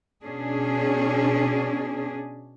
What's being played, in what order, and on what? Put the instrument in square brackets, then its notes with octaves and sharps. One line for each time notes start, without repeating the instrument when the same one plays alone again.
[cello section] B2 C#4 D4 G#4